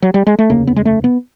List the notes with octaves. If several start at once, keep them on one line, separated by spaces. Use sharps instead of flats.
F#3
G3
G#3
A3
F1 D#2 C#3 A#3
B3
G#3
A3
B3